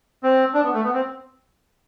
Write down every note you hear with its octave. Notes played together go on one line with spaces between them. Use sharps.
C4
D4
B3
A3
B3
C4